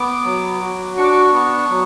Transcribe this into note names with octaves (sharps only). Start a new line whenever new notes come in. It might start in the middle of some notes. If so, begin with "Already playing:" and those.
Already playing: B3 D6
F#3
F#4
D4 C#6
D6
C#6
B3
F#3